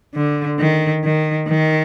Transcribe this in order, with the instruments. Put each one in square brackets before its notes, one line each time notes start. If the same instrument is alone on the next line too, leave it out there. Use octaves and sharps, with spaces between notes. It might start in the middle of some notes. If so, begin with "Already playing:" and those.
[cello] D3
D#3
D#3
D#3